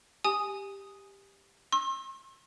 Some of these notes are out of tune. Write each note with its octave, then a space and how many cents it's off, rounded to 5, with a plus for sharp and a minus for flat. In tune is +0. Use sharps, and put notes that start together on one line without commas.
G4 +10 G#5 +0 D#6 +0
C6 +45 E6 -5